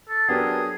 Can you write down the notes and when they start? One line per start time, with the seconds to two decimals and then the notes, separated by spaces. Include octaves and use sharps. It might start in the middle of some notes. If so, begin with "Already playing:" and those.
0.09 A4
0.28 F#3 B3 D4 G4 G#4 A#4